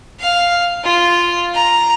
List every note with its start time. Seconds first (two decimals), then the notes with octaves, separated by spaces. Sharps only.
0.20 F5
0.84 F4
1.55 A#5